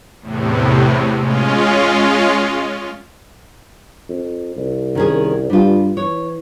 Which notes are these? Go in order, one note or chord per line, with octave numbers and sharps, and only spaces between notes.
E2 A2 C3
G#3 C#4 F4
F2
C2
D#3 C#4 G#4
G2 G3 F4
E3 C#5